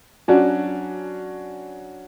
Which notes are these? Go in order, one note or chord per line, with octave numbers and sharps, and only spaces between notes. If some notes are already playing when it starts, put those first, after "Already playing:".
F#3 C#4 D4 F#4